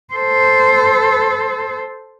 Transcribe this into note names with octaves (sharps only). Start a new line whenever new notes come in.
A4 C5